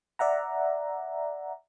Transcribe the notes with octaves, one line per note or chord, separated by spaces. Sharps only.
D5 E5 F#5 A#5